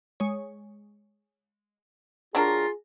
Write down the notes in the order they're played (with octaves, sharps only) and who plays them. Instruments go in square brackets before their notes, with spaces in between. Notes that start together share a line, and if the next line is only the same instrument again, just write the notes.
[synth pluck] G#3 C#5
[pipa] F#3 D4 A#4 [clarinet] F4 [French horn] G#4